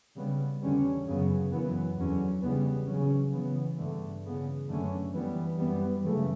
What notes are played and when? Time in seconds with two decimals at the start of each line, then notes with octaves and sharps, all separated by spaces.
0.17 C#3 G3 B3
0.62 E2 D3 G3 C#4
1.06 F#2 C#3 F#3 B3
1.52 F#2 E3 B3
1.97 E2 D3 F#3 C#4
2.42 C#3 E3 G3 B3
2.87 C#3 F#3 C#4
3.32 C#3 E3 B3
3.77 G2 D3 A3
4.22 C#3 E3 B3
4.68 F#2 D3 A3 C#4
5.13 F#2 E3 G3 B3
5.58 F#2 E3 G3 B3
6.04 F#2 C#3 E3 A3